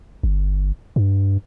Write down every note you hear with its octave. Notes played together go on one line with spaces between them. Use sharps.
G1
G2